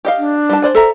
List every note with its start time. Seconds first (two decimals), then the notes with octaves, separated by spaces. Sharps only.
0.05 G4 D#5 F5
0.18 D4
0.49 G3 A5
0.62 C5 D5 G#5
0.75 A4 E5 A#5